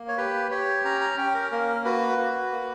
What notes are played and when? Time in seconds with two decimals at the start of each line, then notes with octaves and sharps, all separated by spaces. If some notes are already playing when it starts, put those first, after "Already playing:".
Already playing: A#3
0.08 C#5
0.18 G4 B4
0.51 G4 C#5
0.85 C#4 A#5
1.01 A#5
1.18 C#4 G5
1.34 A#4
1.52 A#3 A#4
1.85 F#4 B4
2.18 F#4
2.52 A#3